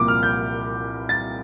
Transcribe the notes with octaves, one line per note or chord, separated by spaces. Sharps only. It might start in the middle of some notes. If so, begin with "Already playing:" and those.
Already playing: C2 A#2 F3 A#3 D6
F6
G6
A6